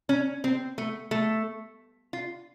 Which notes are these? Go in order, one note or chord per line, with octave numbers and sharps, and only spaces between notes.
C#4
C4
A3
A3
F4